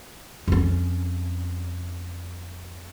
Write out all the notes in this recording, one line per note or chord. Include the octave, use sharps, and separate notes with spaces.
F2 C#4